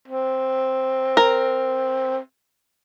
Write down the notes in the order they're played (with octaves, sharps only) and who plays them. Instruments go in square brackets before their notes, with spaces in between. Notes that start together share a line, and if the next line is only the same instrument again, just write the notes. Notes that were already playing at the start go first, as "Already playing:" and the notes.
[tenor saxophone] C4
[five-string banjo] A#4